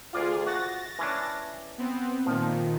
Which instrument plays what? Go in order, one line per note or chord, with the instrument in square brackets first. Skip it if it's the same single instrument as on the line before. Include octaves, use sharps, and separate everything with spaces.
[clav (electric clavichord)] D2 D5 F5 [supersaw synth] F4 G#4
[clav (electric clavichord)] F#4 [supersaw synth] A6 A#6
[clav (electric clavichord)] E3 C#4 D4
[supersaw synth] B3 C4
[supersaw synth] A#2 D#3 [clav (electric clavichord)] F3